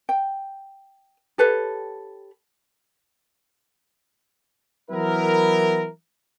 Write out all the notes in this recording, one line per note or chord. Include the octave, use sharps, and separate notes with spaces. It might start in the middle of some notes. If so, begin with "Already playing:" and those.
G5
G4 A4 B4 C#5
E3 F#3 B3 E4 A#4